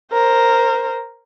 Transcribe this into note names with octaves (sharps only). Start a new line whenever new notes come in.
A#4 C5